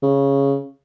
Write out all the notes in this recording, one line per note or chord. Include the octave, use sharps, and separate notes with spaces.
C#3